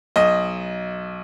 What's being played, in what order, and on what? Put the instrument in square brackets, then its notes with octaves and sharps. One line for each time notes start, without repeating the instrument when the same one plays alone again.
[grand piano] B1 D#5